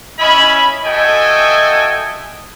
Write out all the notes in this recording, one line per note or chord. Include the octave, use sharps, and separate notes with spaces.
C#4 E4 D#5 G#5 B5
F#4 A4 D#5 E5 G5 G#5